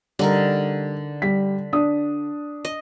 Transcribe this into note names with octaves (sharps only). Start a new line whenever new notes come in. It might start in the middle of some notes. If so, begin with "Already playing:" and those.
D3 G3 D#4 A#4
G3 B6
D4 D#6
D#5